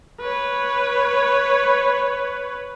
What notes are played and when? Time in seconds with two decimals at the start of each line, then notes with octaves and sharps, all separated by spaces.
0.20 B4 C#5